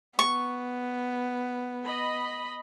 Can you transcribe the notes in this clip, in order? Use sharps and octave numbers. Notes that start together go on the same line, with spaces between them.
B3 C#6
D#5 B5